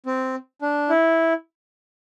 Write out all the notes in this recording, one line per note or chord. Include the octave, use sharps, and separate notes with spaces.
C4
D4
E4